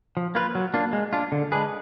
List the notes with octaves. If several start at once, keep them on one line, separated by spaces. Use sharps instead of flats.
F3
A#3 F4 B4
F#3
A#3 D4 F4
G#3
D4 F4
D3
G#3 D4 G#4 B4